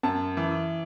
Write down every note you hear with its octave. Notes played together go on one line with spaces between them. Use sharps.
F#2 A5
E3